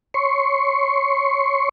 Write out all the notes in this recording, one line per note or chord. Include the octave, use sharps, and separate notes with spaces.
C#5 C6 C#6